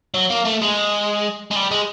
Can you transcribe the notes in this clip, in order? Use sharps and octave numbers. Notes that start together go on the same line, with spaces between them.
F#3
A#3
A3
G#3
G#3
G3
G#3